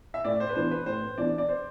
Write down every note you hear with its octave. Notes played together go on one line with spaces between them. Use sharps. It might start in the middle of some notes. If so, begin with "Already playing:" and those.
E5
A2 D5
C5
B4
E3 B3 D4 C5
B4
A2 C5
E3 B3 D4 D5
D5
C5